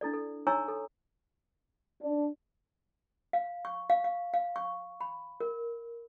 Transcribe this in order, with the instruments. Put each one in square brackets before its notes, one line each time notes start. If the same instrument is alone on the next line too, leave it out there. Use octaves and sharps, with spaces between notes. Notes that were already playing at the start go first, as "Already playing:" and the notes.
[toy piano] D4 E4 A4 D5
A4
D#4 C#5 G#5 A#5 C#6 E6
A4
[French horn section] D4
[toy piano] F5
C#6
F5
F5
F5
C#6
B5
A#4